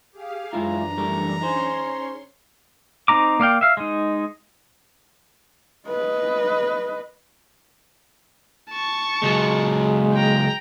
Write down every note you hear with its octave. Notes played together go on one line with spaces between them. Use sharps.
G4 G#4 F5
F#2 E3 G#3 D4 E4 F4 A#5
G3 A3 A#4
C#4 D#4 G#4 C5 C#5 C6
C4 D#4 A#5 D6
A#3 D5 F5 G5
E5 F5
G#3 D#4
B4 D#5
A5 C#6
C#2 F#3 G#3
G5 A#5